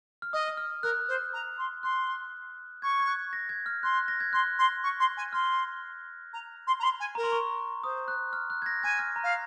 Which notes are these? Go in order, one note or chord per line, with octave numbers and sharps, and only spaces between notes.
F6
D#5 D#6
D#6
F6
A#4 F#6
C5
A#5
C6
C6 F#6
C#6 G#6
G#6
F#6
A#6
G#6
F6
C6 F#6
F#6
A#6
G#6
C6 F#6
C6
C#6
C6
G#5
C6 F6
A#5
C6
A#5
C6
G#5
A#4 A#5
C6
C#6
C5 D#6
F#6
F6
F#6
G#6
A#6
G#5 G#6
F6
A#5
F5